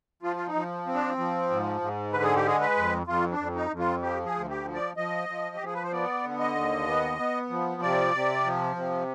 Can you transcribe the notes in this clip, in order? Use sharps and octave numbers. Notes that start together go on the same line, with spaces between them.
F3 F4
F4
D#4
F3
C4
D4
F3
G#2
G#2
D3 B4
G#4
G4
G#3 G#4
B4
F2
F2 F4
D4
F2
D#4
F2
F4
F3 G4
G#4
D2
G4
F3
D5
F3 D#5
F3
G4
F3 G#4
B4
C5
B3 D5
D3
D#5
D#2
B3
B3
F3
C3 D5
C3
F3
C3